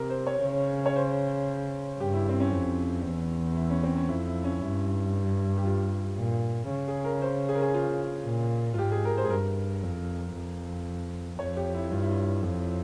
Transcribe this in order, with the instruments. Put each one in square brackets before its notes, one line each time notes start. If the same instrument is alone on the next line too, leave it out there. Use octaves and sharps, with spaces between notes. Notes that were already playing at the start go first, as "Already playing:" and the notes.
Already playing: [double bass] C3 [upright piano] A#4
[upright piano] C5
C#5
[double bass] C#3
[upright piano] C#5
C5
[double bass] G2 [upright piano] G4
[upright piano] E4
C4
C#4
[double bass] F2
E2
[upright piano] E4
C#4
C4
C#4
[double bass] F2 [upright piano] E4
[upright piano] E4
C#4
[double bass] G2 [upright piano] E4
[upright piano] G4
F4
[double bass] A#2
C#3
[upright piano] G#4
A#4
C5
G#4
A#4
G#4
F4
[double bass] A#2
[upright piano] F4
[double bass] G#2 [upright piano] G4
[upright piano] G#4
A#4
C5
G#4
[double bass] G2 [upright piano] A#4
[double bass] F2
F2
[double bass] F2 [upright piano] C#5
[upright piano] G4
E4
[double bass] G2 [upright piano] F4
[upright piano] E4
F4
[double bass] F2